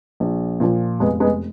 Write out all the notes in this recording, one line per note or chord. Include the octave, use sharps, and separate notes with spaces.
A#1
A#2 F3
F1 G#3 B3
G#3 B3